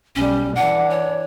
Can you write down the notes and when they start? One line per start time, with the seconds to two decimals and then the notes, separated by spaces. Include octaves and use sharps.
0.16 B1 G3 C#4
0.56 E3 D4 F#5
0.90 C#5